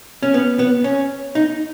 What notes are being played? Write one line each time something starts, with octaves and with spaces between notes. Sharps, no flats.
C#4
B3
B3
C#4
D#4